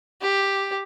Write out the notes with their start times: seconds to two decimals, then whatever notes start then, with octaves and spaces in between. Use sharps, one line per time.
0.21 G4